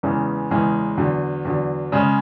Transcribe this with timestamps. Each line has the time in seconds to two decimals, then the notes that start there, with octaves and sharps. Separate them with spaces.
0.03 E2 C#3 E3 G#3 C#4
0.51 E2 C#3 E3 G#3 C#4
0.97 E2 D3 F#3
1.45 E2 D3 F#3
1.92 C#3 G#3 C#4